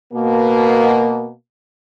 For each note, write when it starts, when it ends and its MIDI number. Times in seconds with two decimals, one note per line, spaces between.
0.13 1.32 47
0.13 1.32 58